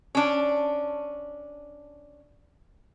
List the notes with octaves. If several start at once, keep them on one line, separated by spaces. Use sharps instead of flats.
C#4 D4